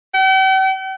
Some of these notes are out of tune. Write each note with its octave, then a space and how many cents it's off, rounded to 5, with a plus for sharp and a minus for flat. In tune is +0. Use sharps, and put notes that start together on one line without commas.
G5 -45